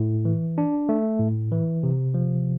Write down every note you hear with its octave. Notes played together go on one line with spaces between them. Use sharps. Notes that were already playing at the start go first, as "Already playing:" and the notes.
Already playing: A2
E3
D4
A3
A2
E3
C3
F3